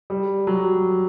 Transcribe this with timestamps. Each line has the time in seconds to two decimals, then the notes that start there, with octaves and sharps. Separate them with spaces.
0.10 G3
0.47 F#3